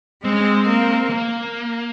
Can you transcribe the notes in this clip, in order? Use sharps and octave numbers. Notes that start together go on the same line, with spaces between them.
G#3 C4
C#4
C4
A#3
C4
A#3